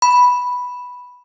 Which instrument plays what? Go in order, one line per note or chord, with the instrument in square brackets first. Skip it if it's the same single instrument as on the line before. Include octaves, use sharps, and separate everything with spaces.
[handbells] B5